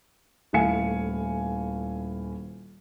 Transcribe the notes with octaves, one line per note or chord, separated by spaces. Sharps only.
D#1 A3 E4 F5 G#5 C#7